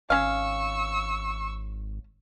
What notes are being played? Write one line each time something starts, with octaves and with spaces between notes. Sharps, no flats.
G#1 C#4 F5 C#6 E6